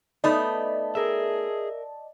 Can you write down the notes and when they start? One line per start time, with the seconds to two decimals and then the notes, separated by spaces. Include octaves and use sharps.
0.24 A3 B3 D#4 D5 D#5 A5
0.95 G#4 A#4 E5